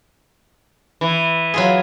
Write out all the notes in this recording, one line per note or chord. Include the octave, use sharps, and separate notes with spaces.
E3
F#3 F4 G#4